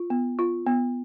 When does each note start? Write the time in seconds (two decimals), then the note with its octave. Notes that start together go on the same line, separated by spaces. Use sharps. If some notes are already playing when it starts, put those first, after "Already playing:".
Already playing: F4
0.10 B3
0.39 F4
0.66 B3